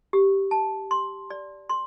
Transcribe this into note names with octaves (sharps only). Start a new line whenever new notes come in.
G4
A5
C6
D5
C6